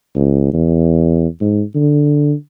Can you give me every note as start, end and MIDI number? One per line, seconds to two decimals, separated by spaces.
0.15 0.54 37
0.54 1.27 40
1.41 1.62 44
1.75 2.33 50